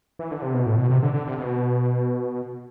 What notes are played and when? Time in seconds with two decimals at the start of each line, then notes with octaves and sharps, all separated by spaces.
0.19 E3
0.31 D3
0.42 C3
0.54 B2
0.66 A2
0.78 B2
0.90 C3
1.03 D3
1.14 D3
1.27 C3
1.39 B2